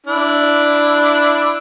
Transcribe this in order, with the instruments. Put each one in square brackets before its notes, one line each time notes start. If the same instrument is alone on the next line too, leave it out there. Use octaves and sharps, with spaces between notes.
[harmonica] D4 E4